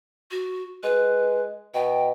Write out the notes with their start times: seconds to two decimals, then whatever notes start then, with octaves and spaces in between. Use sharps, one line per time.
0.31 F#4
0.83 G#3 B4
1.74 B2 G5